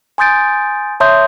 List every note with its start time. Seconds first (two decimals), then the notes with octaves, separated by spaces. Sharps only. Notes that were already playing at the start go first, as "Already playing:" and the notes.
0.18 G#5 C6 D#6 G6 A6 D7
1.00 C#5 E5 A5 C6 D#6 G6